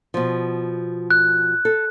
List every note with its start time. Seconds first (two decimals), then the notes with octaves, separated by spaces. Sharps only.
0.14 B2 F3
1.11 F#6
1.65 A4